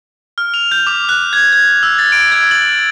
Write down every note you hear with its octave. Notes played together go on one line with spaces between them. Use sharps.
F6
F7
G6
D6
F#6
G#6
G#6
E6
A6
D7
G#6
F#7